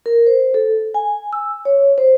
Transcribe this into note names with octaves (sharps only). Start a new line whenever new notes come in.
A#4
C5
A4
G#5
E6
C#5
C5